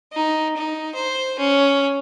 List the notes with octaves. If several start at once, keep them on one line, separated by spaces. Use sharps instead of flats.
D#4
D#4
C5
C#4